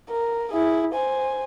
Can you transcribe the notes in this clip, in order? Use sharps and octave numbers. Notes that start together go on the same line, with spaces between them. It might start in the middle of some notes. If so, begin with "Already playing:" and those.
A#4
E4 G#4
C5 G#5